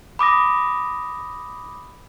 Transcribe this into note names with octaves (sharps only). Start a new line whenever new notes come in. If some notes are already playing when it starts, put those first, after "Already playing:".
B5 D6 D#6 A#6